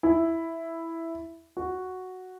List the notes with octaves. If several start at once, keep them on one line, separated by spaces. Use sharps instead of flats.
E4
F#4